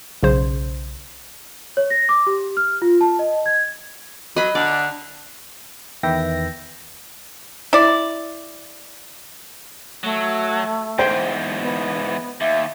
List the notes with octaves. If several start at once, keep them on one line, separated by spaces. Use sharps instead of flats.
B1 C#3 C5
C#5
A#6
D6
G4
F6
F4
A5
D#5
G#6
F#3 D#5 B5
D3 D5
E2 D#3 B4 E5 G5 A#6
E4 D5
F#3 A3
E2 G#2 C5 G5
B3
D#2 E5